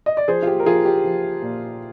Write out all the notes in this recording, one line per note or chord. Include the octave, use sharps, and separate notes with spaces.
D#5
D5
F3 G#4 C5
F4
G4
A#4
F3 F4 G#4
G4
F3
A#2